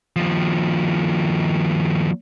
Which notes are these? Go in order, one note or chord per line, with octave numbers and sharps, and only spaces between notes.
D#2 F3